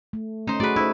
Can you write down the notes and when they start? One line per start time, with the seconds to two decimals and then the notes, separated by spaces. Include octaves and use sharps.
0.13 A3
0.47 A3 C#4 D#4 C5
0.60 A3 F#4 G#4 B4 D5
0.76 D#4 E4 C5